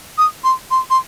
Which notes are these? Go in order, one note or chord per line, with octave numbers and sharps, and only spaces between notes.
D#6
C6
C6
C6